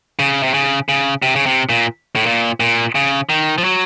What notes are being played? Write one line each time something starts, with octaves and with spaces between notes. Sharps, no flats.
C#3
C3
C#3
C#3
C3
C#3
C3
A#2
A2
A#2
A#2
C#3
D#3
F3
F#3